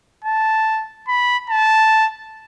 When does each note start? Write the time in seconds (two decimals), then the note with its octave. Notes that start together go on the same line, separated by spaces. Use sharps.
0.25 A5
1.08 B5
1.49 A5